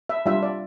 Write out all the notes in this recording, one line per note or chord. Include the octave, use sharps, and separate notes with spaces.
E5
G3 D4 F4 E5
D5